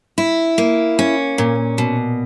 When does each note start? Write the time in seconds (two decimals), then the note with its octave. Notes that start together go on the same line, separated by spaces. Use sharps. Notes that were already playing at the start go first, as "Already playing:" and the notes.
0.18 E4
0.58 A#3
0.99 C#4
1.38 A#2
1.78 B2